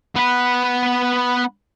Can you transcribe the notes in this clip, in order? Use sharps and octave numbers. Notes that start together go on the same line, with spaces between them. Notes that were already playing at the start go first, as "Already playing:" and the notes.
B3 B4